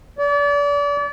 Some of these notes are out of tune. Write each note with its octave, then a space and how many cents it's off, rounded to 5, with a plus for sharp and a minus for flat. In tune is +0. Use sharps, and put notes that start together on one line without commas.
D5 -35